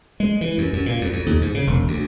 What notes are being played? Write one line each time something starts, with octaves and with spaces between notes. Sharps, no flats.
G#3
E3
F#2
F#2
A#2
F2
F2
D#2
G#2
C#3
E1
D2